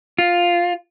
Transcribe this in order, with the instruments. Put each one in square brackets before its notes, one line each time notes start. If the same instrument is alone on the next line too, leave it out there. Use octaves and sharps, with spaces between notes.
[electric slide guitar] F4